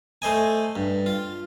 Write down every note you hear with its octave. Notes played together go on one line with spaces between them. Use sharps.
A3 C5 D#5 G#5
G2
F4